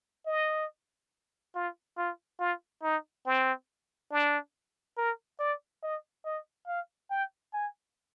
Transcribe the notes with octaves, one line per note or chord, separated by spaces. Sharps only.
D#5
F4
F4
F4
D#4
C4
D4
A#4
D5
D#5
D#5
F5
G5
G#5